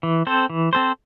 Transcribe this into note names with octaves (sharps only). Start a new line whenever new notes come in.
E3
C4 A4 C5
E3
C4 A4 C5